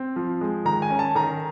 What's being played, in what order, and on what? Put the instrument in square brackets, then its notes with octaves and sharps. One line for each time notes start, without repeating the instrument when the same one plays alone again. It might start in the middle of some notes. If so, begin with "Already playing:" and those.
Already playing: [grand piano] C4
F3
G#3
D#3 A#5
G#5
C#4
A5
D#3 A#5